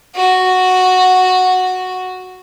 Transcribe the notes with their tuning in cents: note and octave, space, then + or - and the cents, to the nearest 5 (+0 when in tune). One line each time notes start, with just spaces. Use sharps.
F#4 -5